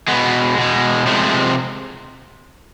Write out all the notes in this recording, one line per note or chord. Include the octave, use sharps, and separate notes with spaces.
B2 G#3 B3
B2 G#3
C3 F3 G#3 A3